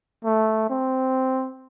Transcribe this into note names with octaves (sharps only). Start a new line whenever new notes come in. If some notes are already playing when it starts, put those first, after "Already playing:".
A3
C4